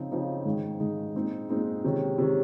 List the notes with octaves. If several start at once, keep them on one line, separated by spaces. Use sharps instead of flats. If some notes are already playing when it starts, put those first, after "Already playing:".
Already playing: C#3 F3 C4 D#4
C#3 F3 C4 D#4
G#2 D#3 G#3 D#4
G#2 D#3 G#3 D#4
A#2 G#3 C4 D#4
A#2 G#3 C4 D#4
C3 D#3 G#3 C#4
C3 D#3 G#3 C#4